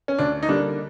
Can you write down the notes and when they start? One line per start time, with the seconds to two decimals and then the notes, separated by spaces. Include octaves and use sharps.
0.08 C#4
0.18 D2 D4
0.43 D#4
0.49 D3 G3 A#3 D4